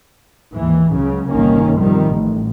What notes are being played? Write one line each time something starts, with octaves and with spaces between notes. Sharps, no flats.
D#2 G#2 E3
C#2 C#3 F#3
G1 C2 D#3 A#3 C#4
C3 D#3 F3 G3
A1 A2